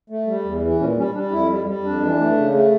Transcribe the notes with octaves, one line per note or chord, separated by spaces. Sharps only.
A3
G3
E2
E3
A#2 C#4
G3 C#4
G3 D4
F2 E4
G3
G3
F2 D4
E3
A3
C#3
A3